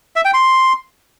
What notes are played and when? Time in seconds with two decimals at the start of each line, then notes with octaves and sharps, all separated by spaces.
0.16 E5
0.25 G5
0.34 C6